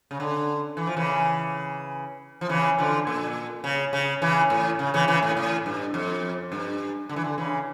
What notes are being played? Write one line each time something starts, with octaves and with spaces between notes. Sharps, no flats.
C#3
D3
E3
F3
C#3 E3
F3
C#3 E3
D3 F3
A#2
C#3
C#3
C#3 E3
A2
C#3
C#3 E3
C#3 E3
A2
A2
G2
F2
G2
D3
E3
D3
C#3 E3